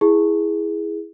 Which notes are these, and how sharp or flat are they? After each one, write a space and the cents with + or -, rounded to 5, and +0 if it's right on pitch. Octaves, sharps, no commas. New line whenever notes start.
E4 +0 G#4 +0